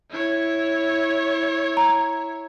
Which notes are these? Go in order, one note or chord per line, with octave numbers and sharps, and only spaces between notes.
E4 C#5
A#5